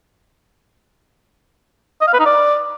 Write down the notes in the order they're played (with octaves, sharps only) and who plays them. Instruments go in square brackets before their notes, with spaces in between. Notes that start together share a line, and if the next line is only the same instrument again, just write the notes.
[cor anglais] D#5
F5
B4
D#4
D5